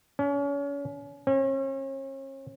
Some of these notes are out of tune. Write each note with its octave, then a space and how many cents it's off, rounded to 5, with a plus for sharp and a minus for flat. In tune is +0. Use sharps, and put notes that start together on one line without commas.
C#4 +35
C#4 -40